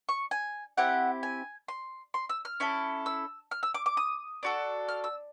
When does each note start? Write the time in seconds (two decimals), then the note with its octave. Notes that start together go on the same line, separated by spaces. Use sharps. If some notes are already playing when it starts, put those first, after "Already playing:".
0.09 C#6
0.31 G#5
0.77 C4 E4 G4 F#5
1.23 G#5
1.68 C6
2.14 C6
2.29 E6
2.45 F6
2.60 C#4 E4 A4
3.06 E6
3.51 F6
3.63 E6
3.74 D6
3.86 D6
3.97 D#6
4.43 D4 F#4 A4
4.89 F6
5.04 E6